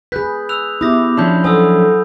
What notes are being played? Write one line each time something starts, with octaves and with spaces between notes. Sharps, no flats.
G#4 B4 F#6 G6 B6
E6 F#6 F7
B3 E4 G4 D6 D#6 A#6
F3 C#4 D4 A5 B5 G6
F#3 A4 C5 G#5 D#6 E6